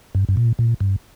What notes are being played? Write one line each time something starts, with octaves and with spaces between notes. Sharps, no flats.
G2
G2
A#2
A#2
G2